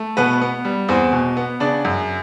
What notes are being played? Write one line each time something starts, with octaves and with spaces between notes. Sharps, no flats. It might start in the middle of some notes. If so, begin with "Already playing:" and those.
Already playing: A3
B2 B3 B4
B3
G3
E2 C4 C5
B2
B3
C#3 D4 D5
F#2